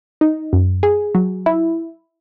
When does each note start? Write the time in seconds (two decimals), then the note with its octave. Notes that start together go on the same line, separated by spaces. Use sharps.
0.21 D#4
0.53 F#2
0.83 G#4
1.15 F#3
1.46 E4